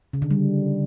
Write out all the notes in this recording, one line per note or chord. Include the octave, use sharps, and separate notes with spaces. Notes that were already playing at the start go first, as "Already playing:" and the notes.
C#3
D3
G3